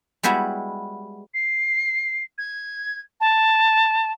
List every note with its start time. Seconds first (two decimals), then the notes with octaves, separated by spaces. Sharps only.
0.23 G3 G#3 B3 E4 F#4
1.34 C7
2.38 G#6
3.20 A5